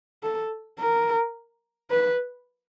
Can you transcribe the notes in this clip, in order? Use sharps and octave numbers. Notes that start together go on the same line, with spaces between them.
A4
A#4
B4